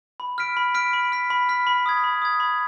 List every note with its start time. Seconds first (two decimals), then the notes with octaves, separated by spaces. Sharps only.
0.20 B5
0.38 F6 B6 D7
0.57 B5
0.74 F6 B6 D7
0.93 B5
1.12 F6 B6
1.30 B5
1.49 F6 B6
1.67 B5
1.86 D#6 G#6
2.04 B5
2.22 D#6 G#6
2.40 B5